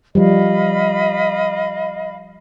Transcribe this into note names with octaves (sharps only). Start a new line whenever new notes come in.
F3 G3 D#5 F5 B5